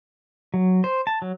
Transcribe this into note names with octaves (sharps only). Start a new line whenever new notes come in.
F#3
C5
A5
F#3